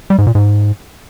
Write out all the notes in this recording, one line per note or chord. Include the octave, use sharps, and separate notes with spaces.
G3
G#2
A#2
G#2